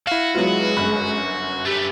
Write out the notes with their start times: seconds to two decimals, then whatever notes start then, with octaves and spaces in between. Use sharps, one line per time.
0.07 E4 F#4 F5
0.35 F#3 G#3 B3 F4
0.77 G1 F#2 B5
1.66 A3 B3 G4